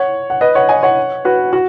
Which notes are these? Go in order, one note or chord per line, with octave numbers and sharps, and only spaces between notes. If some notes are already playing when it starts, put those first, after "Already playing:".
Already playing: C#5 F#5
F#5
B4 D#5
C#5 F#5
D#5 G#5
C#5 F#5
F#4 B4
F#4